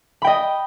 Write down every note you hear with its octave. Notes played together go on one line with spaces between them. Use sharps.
D#5 G5 B5